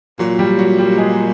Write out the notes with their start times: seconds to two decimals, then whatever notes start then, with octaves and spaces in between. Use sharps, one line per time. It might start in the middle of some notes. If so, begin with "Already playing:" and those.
0.19 A#2 F#3 F#4
0.39 G3 G4
0.58 F#3 F#4
0.78 G3 G4
0.98 G#3 G#4